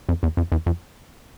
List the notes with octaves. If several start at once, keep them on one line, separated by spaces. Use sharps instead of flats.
F2
E2
F2
E2
F2